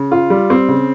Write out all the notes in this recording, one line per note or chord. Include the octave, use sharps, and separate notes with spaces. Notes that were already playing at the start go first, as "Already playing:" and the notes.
Already playing: C#3
F4
G3
C4
C#3